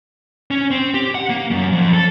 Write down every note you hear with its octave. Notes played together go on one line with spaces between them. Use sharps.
C#4
C4
G4
F#5
A#3
F#2
F2
A4